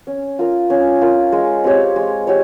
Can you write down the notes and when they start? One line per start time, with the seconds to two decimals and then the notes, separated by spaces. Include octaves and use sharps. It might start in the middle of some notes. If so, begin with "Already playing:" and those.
0.07 C#4
0.39 F4 A#4
0.70 C#4
1.01 F4 A#4
1.32 G#3
1.64 C4 G4 C#5
1.96 G#3
2.27 G4 C#5